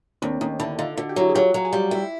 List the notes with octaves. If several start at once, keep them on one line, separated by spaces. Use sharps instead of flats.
D#2 C4 D4
D#2 C#4 D#4
D3 D4 E4
D3 D#4 F4
D3 F#4
G4
F#3 E4 F#4
G#4
F#3 F4 G4
F#3
G#4
G3 F4 G4
E4